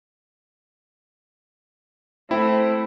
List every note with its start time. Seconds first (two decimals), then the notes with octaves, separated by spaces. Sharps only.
2.31 A3 C4 E4